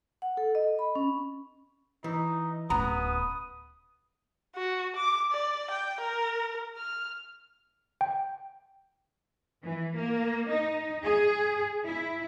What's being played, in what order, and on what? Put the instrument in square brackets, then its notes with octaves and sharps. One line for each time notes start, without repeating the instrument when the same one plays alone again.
[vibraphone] F#5
A4
D#5
B5
C#4
[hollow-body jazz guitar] E3 [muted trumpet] D#4
[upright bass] D1 C#4 [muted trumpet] B3 [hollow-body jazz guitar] A#5 [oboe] D#6
[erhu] F#4
D6
D5
G5
A#4
F6
[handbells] G5
[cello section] E3
A#3
D#4
G#4
E4